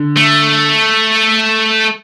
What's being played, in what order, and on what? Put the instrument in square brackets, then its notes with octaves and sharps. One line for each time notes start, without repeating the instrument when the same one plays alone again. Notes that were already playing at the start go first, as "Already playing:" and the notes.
Already playing: [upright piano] D3
[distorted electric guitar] A3